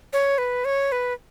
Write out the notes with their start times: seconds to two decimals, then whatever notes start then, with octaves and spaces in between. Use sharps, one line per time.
0.13 C#5
0.38 B4
0.65 C#5
0.92 B4